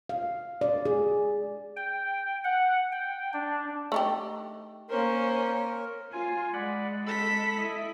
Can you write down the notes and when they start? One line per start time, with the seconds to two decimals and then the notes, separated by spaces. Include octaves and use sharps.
0.09 F5
0.61 D5
0.85 G#4
1.76 G5
2.44 F#5
2.92 G5
3.33 D4
3.92 A3 D#4 G4
4.90 A#3 C#4 A#4 C5
6.13 F4 G#5
6.53 G#3 D5 F#5 B5
7.06 A4 B5 E6 B6
7.58 E4 D#5